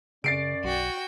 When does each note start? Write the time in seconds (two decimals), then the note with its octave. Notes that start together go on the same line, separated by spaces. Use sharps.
0.24 F#2 C#3 C#4 D5 A6 C7 D7
0.64 B1 F#4 G5